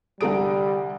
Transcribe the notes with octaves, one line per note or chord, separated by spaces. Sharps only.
C2 D3 G3 A4 A#5 D#6 D7